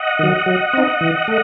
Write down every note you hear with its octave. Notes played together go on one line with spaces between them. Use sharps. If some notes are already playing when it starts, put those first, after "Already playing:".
Already playing: D#5 F#5
D#3 F#3
F#3
C4 D#4
E3
A3